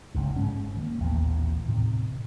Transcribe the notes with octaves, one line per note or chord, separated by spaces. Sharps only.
F#1 C#2 G#2
G#2 G#3 C#4
D#3 A#3
A1 D#2 A#2 B3
A2 C3 D#3